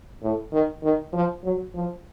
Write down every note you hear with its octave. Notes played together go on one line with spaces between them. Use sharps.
A2
D#3
D#3
F3
F#3
F3